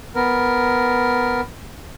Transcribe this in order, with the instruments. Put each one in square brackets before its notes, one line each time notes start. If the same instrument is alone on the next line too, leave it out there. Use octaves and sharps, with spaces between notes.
[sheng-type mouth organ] B3 A#4